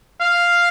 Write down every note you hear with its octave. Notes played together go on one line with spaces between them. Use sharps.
F5